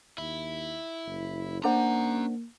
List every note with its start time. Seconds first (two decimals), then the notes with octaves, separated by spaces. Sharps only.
0.18 D#2 E4
1.06 F#1
1.64 A#3 C#4 D4 C5 F#5 A#5